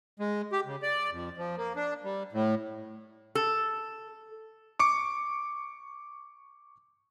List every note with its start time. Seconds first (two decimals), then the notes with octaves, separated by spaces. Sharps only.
0.20 G#3
0.52 G4
0.66 C#3
0.83 D5
1.11 F2
1.37 F3
1.57 A#3
1.76 D4
2.04 G3
2.32 A2
3.35 A4
4.79 C#6 D6 C#7